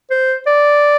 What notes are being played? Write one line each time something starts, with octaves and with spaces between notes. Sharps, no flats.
C5
D5